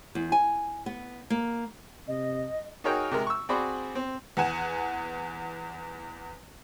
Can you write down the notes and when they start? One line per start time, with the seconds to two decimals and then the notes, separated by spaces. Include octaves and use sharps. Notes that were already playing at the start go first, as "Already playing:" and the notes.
0.15 E2
0.32 G#5
0.86 B3
1.30 A#3
2.08 C3 D#5
2.84 D#4 F#4 G#4 A#4 C#5 G5
3.11 C3 G#3 A#4
3.27 C#6 E6
3.49 C4 F#4 G#4 D5 B5 C6
3.95 C4
4.37 E2 F#5 G#5 E7